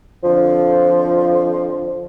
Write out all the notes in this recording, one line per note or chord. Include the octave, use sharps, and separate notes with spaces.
F2 D3 F3